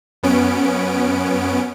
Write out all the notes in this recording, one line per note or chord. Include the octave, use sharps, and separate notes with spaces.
F#2 B3 C#4 D7